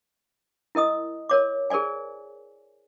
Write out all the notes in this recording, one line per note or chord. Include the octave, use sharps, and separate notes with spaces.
E4 A#4 D#5 D#6
A#4 C#5 D6
G#4 A#4 C5 D5 G#5